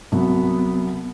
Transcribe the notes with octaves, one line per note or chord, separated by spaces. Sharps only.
C2 F#3 B3